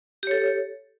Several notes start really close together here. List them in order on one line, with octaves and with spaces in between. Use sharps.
G4 C#5 A4